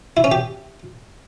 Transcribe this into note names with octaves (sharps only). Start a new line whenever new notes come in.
E4
C#4
G4